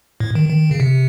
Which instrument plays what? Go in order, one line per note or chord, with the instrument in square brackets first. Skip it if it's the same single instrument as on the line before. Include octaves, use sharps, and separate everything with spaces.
[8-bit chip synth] A2
D#3
D#3
C#3
C3